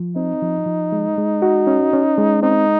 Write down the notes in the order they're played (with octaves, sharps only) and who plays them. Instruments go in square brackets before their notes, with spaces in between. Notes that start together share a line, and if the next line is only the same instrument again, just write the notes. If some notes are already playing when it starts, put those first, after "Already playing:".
Already playing: [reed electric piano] F3
[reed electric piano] C4 [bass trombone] D#4
[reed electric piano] F3
F3
G#3
G#3
F#4
C#4
C#4
G#3
[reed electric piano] C4 [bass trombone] D#4